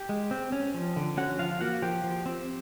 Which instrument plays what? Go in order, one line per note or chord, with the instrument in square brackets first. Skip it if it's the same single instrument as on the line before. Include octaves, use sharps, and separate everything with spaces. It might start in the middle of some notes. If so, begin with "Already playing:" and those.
Already playing: [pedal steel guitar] G4 G5
G#3
C4
C#4
F3
D3
C#4 F#4 F#5
F3 F4 F5
A#3 F#4 F#5
F3 G4 G5
F3
C4